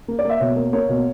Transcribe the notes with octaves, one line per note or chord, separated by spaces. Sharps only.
A#3
D5
A#3 E5
B2 C#5
A#3
A#3 C#5
B2